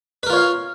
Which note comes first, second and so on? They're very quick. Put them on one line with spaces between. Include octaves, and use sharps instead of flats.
B4 A#4 F4 C#5 F5